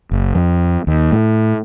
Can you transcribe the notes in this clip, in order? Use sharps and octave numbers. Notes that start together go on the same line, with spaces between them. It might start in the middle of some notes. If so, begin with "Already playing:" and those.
F#1
F2
D#2
A2